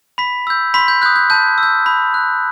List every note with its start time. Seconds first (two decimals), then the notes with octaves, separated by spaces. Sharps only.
0.18 B5 B6
0.47 E6 G6
0.74 B5 C6 B6
0.88 G6
1.02 D#6 F#6 G6
1.16 G6
1.30 A5 G6
1.58 E6
1.63 G6
1.86 B5
2.14 F#6